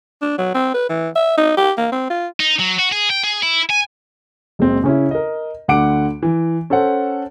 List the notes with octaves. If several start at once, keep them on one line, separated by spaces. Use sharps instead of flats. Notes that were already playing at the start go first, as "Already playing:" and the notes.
D4
F#3
C4
B4
E3
E5
D#4
G4
A#3
C4
F4
D#4
F#3
F#4
G#4
G5
G#4
E4
G#5
F#1 G#3 C4
C#3 C#4 E4
A#4 D#5
D2 D3 F#5 D6 D7
E3
C#4 A4 C5 F#5